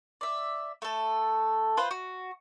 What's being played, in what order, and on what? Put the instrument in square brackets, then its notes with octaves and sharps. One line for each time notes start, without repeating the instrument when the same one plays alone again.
[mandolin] D5 E5
A3 A4
F4 B4 C5
F#4